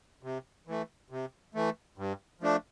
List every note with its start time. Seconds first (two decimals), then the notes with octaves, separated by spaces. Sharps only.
0.23 C3
0.67 E3 A3
1.10 C3
1.55 E3 A3
1.98 G2
2.41 F3 A3 D4